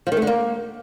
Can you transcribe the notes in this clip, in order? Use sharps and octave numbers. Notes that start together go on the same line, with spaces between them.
F3
D#3
A3
D3
A#3